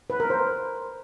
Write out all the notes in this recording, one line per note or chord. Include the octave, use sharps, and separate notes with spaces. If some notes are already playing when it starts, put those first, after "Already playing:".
B4
A#4
C5